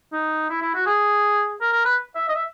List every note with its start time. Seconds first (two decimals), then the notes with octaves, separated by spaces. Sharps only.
0.12 D#4
0.49 E4
0.61 E4
0.74 F#4
0.86 G#4
1.61 A#4
1.72 A#4
1.84 B4
2.15 E5
2.28 D#5
2.35 E5